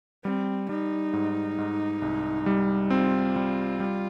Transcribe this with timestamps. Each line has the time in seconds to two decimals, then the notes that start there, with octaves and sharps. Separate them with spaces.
0.24 G3 C4
0.69 G3 D#4
1.13 G#2
1.58 G#2
2.02 C2
2.46 G3
2.90 C4 F4
3.36 G3
3.80 G3